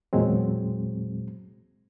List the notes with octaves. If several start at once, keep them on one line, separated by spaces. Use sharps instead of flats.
E2 A#2 F#3 G#3 C4